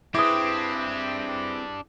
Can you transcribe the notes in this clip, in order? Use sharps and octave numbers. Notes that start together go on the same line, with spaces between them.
C4 D4 E4 G4 G#4 B4 D6 D#6